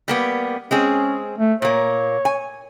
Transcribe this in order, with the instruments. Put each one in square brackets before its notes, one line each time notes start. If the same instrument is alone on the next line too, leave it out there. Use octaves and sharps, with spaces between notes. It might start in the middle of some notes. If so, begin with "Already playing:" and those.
[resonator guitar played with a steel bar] G3 A#3 B3
[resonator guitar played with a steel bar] G#3 C4 G#4 [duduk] C#4
[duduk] A3
[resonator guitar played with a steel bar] A#2 A#3 [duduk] C#5
[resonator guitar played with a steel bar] G#5